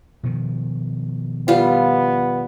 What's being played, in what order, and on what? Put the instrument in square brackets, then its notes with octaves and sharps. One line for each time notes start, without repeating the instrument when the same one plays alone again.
[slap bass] B2 D#3 F3
[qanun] G3 F4 [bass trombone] B3